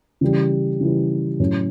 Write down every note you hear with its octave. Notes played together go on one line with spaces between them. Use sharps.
C#3 E3 G3
C#3 E3 G3
A2 F#3 C#4